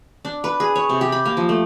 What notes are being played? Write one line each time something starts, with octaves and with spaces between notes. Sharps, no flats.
D4
B4
G#4
C#5
C3
G4
B5
A#3
F3
A3